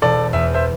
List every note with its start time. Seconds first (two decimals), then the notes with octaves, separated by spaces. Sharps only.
0.02 E1 A4 D5
0.33 E2 E5
0.54 C5 E5